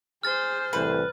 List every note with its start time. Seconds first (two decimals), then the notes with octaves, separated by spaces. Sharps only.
0.23 G#4 C5 F6 A6
0.73 C2 A2 E3 B4